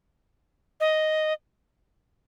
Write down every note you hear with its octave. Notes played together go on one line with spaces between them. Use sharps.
D#5